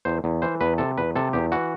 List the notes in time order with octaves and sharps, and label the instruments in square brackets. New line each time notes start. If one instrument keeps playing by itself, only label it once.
[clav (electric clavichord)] E2 C5
E2
E3 C5
E2 B4
C3 A4
E2 B4
C3 A4
E2 G4
E3 F#4